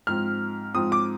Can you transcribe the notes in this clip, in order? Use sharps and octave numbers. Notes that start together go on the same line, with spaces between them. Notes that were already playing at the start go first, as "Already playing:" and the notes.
G#2 F3 C4 F6
G#2 F3 C4 D#6
D6